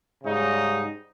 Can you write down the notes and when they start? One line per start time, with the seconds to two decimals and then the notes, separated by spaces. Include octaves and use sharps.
0.24 G#2 C#3 G3 D#4